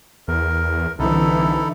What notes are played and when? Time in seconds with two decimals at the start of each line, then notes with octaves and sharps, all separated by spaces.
0.28 E2 A#4
0.99 C2 D3 E3 D#4 E4 A4